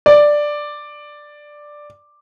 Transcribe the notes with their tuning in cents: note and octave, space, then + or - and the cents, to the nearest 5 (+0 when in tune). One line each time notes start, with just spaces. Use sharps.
D5 +5